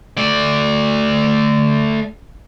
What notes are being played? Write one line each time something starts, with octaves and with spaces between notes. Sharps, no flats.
A3 D5